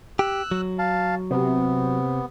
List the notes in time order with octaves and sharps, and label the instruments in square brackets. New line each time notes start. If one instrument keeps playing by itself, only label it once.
[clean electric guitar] G4 [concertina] E6 F#6
[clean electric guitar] F#3
[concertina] F5 A5
[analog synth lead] C3 [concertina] B3